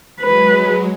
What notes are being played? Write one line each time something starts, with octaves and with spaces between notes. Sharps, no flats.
F#3 G#3 B4